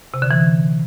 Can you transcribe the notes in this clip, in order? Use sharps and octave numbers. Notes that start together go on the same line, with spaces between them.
C3
D3
E3